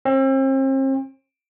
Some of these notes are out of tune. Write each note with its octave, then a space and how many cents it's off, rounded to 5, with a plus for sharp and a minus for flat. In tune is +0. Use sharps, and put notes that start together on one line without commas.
C4 +40